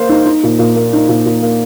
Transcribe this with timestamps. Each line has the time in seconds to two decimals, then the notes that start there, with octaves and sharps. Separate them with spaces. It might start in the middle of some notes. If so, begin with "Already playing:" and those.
Already playing: A#3 C5 F5
0.09 D#4
0.26 D#4
0.43 A#2
0.59 A#2
0.76 A#3
0.93 D#4
1.09 A#2
1.26 A#2
1.43 A#3